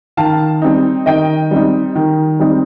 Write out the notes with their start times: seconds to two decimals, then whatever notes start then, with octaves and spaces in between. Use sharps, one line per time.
0.17 D#3 F5 A5
0.62 G3 C4 D#4
1.06 D#3 D#5 G5
1.51 G3 C4 D#4
1.95 D#3
2.40 G3 C4 D#4